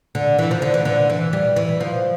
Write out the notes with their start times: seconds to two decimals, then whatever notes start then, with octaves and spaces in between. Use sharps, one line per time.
0.15 D3
0.39 E3
0.51 F3
0.62 D3
0.74 E3
0.85 D3
1.10 E3
1.33 G3
1.56 E3
1.81 F3